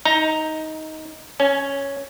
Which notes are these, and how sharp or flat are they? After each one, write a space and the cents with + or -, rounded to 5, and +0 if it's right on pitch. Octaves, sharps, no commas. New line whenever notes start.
D#4 +15 A#5 -5
C#4 +0 G#5 +30